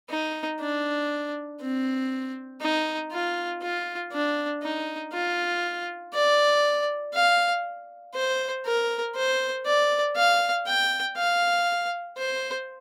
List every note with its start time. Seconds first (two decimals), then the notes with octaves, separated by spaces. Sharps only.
0.10 D#4
0.60 D4
1.61 C4
2.61 D#4
3.12 F4
3.62 F4
4.13 D4
4.63 D#4
5.13 F4
6.14 D5
7.14 F5
8.15 C5
8.65 A#4
9.16 C5
9.66 D5
10.16 F5
10.66 G5
11.17 F5
12.18 C5